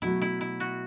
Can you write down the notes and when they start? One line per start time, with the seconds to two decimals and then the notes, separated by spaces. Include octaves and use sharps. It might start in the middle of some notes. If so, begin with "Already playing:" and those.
0.02 B2 F#3 A3 E4
0.22 E4
0.41 E4
0.60 F#4